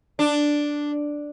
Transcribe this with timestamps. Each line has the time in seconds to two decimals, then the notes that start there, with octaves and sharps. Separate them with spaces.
0.19 D4